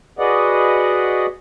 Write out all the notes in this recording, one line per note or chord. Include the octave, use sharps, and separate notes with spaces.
F#4 G#4 B4 D5 D#5 F#5